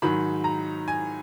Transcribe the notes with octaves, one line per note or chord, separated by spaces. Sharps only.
G#2 D#3 F#3 B5
A#5
G#5